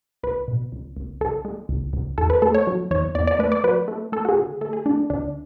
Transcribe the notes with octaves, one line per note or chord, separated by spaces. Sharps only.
C#2 B4
B2
C#2
C#2
C#2 A4
G#3
C#2
C#2
E2 A4
B4
A3 A4
C#5
F#3
E2 C#5
E2 D5
D5
A3 B4
D5
F#3 B4
A3
A3 A4
F#4
G#4
D3
A3 A4
G#4
A3 D4
D2 D4